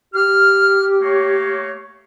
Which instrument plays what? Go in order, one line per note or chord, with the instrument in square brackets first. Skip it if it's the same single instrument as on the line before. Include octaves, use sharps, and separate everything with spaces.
[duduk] G4 [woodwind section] F6
[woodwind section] A3 A#3 C#5